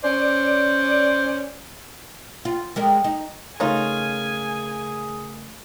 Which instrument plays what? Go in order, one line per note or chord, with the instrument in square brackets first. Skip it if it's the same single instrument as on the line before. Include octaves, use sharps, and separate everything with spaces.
[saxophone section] C#4 C5 D5
[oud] F4
G3 G#3 A#4
D#4
[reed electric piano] C#3 A3 A#4 [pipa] C#4 D#4 F4 [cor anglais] G#4 [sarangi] G#5